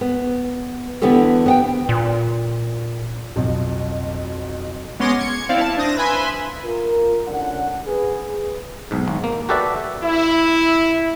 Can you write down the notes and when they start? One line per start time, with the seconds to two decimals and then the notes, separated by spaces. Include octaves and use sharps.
0.01 B3
1.02 D3 E3 B3 E4 G4 A4
1.46 B3 F#5 G5
1.89 A#2
3.36 B1 F2
4.99 G#3 B3 C#4 C6 D6 A#6
5.19 G#6 C#7
5.49 C4 E4 D5 F5
5.61 A5
5.77 D4 C5 D#6 A#6
5.97 B4 E5 G#5 B5 C6
6.63 F4 A#4
7.27 C2 D3 C#4 D4 F#5
7.86 G#4 B4
8.91 B1 G#2
9.08 G#1
9.24 A#3
9.49 F#4 G4 A4 B4 D5 E5
10.03 E4